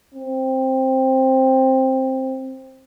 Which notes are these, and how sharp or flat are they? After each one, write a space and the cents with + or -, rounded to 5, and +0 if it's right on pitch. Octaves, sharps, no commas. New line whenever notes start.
C4 +10